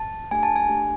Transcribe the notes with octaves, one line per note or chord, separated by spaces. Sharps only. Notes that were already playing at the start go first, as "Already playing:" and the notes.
Already playing: A5
A3 D4 G4 G#5
A5
G#5
A3 D4 G4